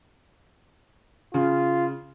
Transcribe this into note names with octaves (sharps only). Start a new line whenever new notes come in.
C#3 F4